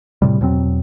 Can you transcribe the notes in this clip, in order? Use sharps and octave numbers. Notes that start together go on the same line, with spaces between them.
A2 C3 G3
E2 B2 F#3 C4